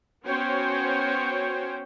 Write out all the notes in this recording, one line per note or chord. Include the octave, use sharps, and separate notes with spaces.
B3 C#4 F#4 C5 C#5 G5